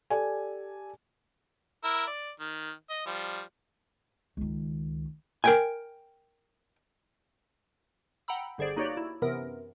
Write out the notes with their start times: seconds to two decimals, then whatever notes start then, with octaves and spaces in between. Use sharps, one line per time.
0.10 G4 A4 D5 G#5
1.84 E4 A#4 E6
2.07 D5
2.40 D#3
2.90 D#5
3.06 F3 G3
4.37 C#2 D#3
5.44 A#4 G5 G#5
8.28 F#5 G5 A#5 B5 E6
8.58 G1 D3 G#4 C5 D5 D7
8.76 A#3 D#4 F#4 G4 C#5 D5
8.97 E4
9.22 F#2 C3 E3 B3 A#4